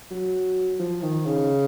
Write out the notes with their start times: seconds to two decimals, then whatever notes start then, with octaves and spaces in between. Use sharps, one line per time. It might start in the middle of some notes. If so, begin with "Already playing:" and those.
0.11 F#3
0.79 F3
1.02 D#3
1.26 C#3